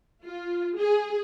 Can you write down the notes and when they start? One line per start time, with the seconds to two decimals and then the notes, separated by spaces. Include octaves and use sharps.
0.23 F4
0.77 G#4